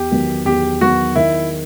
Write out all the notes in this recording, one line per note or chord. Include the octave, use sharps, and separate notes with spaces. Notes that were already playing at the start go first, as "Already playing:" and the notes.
Already playing: E2 G4
D#3 F#3 B3
E2 G4
D#3 F#3 B3 F#4
D#3 E4